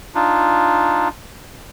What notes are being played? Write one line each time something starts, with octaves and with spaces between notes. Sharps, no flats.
D4 D#4 F4